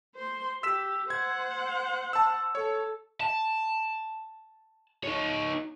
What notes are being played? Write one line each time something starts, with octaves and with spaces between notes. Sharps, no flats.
C5 C6
G4 E6 B6 E7
C5 F#5 G#6
A5 E6
A4 C#5
A5
D#4 C#5